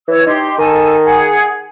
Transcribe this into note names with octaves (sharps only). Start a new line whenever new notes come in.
E3 C#5 E6
D#4 G4 C6
D#3 A4 G#5
G#4 F#5